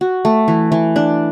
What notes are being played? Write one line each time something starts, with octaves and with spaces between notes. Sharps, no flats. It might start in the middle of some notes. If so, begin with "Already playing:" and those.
F#4
A3
E3
E3
D4